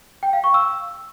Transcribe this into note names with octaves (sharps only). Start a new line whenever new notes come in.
G5
F5
C#6
E6